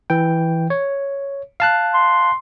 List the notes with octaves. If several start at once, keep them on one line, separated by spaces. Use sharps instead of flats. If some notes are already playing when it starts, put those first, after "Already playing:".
E3 G5
C#5
F5 A5 F#6
C6